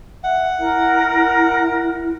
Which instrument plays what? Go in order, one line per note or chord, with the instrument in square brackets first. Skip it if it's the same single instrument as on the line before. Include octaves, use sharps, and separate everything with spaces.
[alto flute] E5 [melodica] F#5
[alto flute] E4 [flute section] A#4